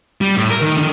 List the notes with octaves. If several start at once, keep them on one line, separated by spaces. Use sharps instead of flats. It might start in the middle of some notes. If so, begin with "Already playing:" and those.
G3
A2
A#4
D#3
D3 D#3